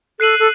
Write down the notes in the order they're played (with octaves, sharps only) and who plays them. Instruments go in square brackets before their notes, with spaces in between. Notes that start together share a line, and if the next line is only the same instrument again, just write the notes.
[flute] A4 [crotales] F#6 C7 D#7 F#7
[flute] A4